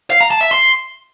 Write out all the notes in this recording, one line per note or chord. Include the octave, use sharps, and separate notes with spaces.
F5
A#5
A5
E5
C6